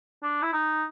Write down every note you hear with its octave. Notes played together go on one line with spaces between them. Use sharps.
D4
E4
D#4